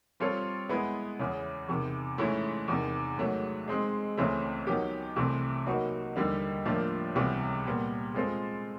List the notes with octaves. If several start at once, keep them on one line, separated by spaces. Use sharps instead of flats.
G3 C4 F4 A4 C#5
G#3 B3 E4 G#4 B4
E2 C#3 E3
E2 C3 D#3
G#2 E3 A3 C#4 E4
E2 C3 D#3
G#2 D#3 F#3 A3
G#3 C4 D#4 G#4
C#2 C#3 E3 A3 C4
D#3 F#3 B3 D#4 G4
C2 C3 E3 A3 C4
F#3 A#3 D#4 F#4 B4
D#2 D3 G3 A#3 D#4
A2 F3 A#3 D4 F4
C#2 C3 E3 G3 B3
A#2 G3 B3
G#3 C4 F4 A4 C5